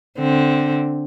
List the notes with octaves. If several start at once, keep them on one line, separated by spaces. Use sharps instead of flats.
D3 C4